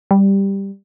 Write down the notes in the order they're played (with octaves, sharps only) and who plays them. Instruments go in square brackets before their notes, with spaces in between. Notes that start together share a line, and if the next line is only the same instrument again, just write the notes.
[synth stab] G3